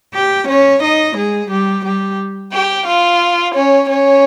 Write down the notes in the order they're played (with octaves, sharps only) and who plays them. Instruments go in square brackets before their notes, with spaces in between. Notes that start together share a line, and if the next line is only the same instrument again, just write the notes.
[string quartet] G4 G5
C#4 C#5
D#4 D#5
G#3 G#4
G3 G4
G3 G4
G4 G5
F4 F5
C#4 C#5
C#4 C#5